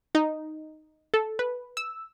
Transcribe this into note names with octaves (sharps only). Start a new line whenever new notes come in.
D#4
A4
B4
E6